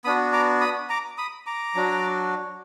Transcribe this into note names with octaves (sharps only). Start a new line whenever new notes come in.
B3 D4 F#4 B5 D#6
A#5 D6
B5 D#6
A#5 D6
B5 D#6
A#5 D6
F#3 D4 F#4